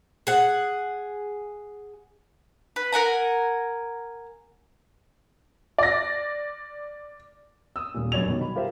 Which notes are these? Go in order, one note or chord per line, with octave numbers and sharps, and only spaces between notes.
G#4 F#5
B4
A#4 F#5 G#5 A#5
D5 A#6
D#6 E6
D#1 A#2
F1 F#2 C#5 D5 G#6 F7
G2 B2 D#3
B5
F4 G4 A#4 C5 E5